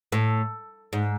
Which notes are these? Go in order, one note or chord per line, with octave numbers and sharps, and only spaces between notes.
A2
G#2